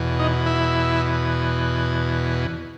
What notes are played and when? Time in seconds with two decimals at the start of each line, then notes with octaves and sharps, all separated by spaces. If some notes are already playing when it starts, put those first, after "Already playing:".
Already playing: E2 B2
0.19 D#4
0.46 E4